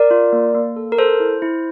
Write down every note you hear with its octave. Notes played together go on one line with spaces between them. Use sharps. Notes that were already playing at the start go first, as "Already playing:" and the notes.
Already playing: A#4 D5
F4
A#3
A#3
A4
A#4
A4 C5
E4
E4